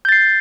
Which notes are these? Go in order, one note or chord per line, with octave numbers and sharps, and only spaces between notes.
G6 A6 C7